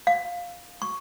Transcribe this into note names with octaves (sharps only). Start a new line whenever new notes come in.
F5
C#6